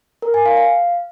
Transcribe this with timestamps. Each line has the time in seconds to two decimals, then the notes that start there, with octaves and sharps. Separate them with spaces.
0.22 A#4
0.34 G#5
0.46 F5
0.57 F5